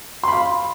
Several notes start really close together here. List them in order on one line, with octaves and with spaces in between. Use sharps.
C6 B5 F5